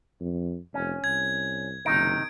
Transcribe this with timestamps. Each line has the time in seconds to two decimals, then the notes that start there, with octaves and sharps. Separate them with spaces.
0.21 F2
0.74 F1 C#4
1.04 C2 G#6
1.86 F#1 C3 D#3 D#4 D7